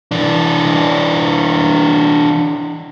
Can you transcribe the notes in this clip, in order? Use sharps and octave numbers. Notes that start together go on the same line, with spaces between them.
E3 D4